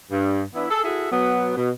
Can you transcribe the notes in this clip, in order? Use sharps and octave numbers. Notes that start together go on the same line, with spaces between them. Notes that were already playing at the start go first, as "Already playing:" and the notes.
G2
E3 B3 D4 E4
G#4 A4
E4 F#4 G#4 A4 E5
B2 F#3 B3
B2